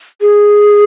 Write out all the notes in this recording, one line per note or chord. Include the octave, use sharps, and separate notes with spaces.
G#4